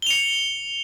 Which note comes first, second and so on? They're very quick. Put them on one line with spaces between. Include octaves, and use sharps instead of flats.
G7 F7 C#7